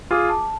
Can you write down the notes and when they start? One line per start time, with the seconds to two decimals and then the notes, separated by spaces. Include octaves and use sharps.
0.11 F4 G#4 D6
0.29 A5